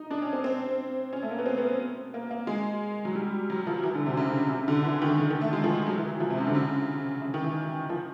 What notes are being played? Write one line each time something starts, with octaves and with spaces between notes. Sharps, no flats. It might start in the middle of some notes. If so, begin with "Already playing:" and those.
Already playing: D#4
D4
C#4
C4
C4
C#4
A3
A#3
B3
C4
B3
A#3
A#3
G#3
F#3
G3
F#3
F3
E3
D3
C3
C#3
C3
C#3
D3
E3
D#3
D3
D#3
A3
G#3
F3
F#3
E3
F3
C3
C#3
D3
C#3
C#3
D#3
E3
F3